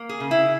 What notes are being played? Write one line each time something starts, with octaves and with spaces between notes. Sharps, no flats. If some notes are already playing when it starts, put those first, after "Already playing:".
Already playing: A#3
G#4
C#3
E4